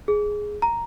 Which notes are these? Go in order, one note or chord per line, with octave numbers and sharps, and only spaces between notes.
G#4
A#5